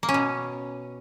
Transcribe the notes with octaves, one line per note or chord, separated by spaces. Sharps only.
A#3
C#4
B2